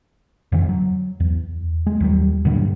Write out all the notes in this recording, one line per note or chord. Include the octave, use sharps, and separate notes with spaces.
F2 D3 E3
F#3
E2
G#3
D#2 F#3 G3
G2 A#2 D3 F#3